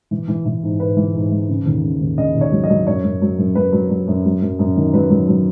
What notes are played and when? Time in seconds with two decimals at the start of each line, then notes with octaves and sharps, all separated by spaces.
0.11 E3
0.28 E3
0.46 E3
0.63 G#2
0.80 G#2 B4
0.97 E3
1.15 G#2
1.32 E3
1.49 C#3
1.66 D#2
1.83 C#3
2.01 D#2
2.18 C#3 D#5
2.35 D#2
2.41 C#5
2.52 F#3
2.64 D#5
2.70 F#3
2.87 F#2 C#5
3.04 F#2
3.22 F#3
3.38 F#2
3.55 F#2 B4
3.72 F#3
3.90 F#3
4.07 F#2
4.25 F#3
4.42 F#2
4.59 F#2
4.76 D#3
4.94 F#3 B4
5.10 F#3
5.28 F#3